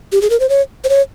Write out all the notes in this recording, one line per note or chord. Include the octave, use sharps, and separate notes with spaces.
G4
G#4
A#4
C5
C#5
C5
C#5